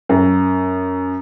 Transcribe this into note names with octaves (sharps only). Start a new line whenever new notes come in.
F#2